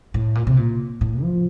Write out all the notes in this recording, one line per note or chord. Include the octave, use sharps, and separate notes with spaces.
A2
A#2
C3
A#2
A2
F3